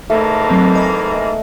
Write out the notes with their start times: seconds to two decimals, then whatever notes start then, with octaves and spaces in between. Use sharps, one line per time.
0.10 E2 G#2 A3 A#3
0.50 F#3 A3 C4
0.75 D#5 G#5 B5